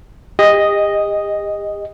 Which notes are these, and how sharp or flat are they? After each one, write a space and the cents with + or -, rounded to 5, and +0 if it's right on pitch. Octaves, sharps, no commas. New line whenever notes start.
G4 +40 D#5 +0